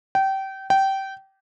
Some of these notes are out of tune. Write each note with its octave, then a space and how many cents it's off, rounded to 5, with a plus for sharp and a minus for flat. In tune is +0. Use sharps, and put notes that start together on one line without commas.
G5 -25
G5 -20